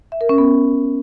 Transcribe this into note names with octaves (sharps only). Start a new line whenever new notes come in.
E5
A#4
C#4
B3